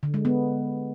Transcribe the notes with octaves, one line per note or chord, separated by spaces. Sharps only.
D3
G#3
B3